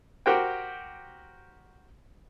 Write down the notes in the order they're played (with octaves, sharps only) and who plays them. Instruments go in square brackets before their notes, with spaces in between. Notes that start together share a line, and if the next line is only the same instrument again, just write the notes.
[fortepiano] F#4 G4 A#4 C5 G5